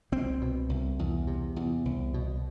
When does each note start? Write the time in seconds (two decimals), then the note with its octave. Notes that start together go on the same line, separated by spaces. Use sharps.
0.12 C2 C4
0.41 B2
0.69 C2
0.99 E2
1.27 C3
1.56 E2
1.85 C2
2.14 B2